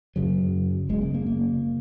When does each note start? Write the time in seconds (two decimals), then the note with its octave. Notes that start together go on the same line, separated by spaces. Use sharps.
0.16 F#1 F#2 C#3 F#3
0.89 F#1 F#2 C#3 G#3
1.02 A#3
1.14 A#3
1.26 A#3